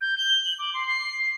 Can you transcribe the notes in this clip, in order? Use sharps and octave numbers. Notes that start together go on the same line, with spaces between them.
G6
G7
F#7
D6
C6
C7